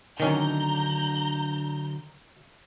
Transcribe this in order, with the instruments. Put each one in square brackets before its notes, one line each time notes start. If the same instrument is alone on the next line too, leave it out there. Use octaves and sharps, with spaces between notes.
[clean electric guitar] D3 F#3 D4 [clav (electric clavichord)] D#3 C#4 [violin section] A#5 G6